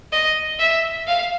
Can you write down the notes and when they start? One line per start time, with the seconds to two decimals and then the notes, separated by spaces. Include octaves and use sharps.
0.12 D#5
0.59 E5
1.07 F5